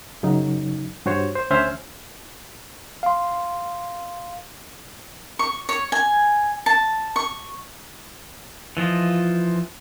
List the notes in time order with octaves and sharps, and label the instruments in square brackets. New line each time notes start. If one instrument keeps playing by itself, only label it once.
[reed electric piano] F#2 C#3 F#3 D#4
G2 F#4 C5 C#5
C5
D2 C#4 C5 E5 G#5 F6
[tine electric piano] F5 C6
[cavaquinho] C#6
C#5
G#5
A5
C#6
[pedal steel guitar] E3 F3 F4 D#5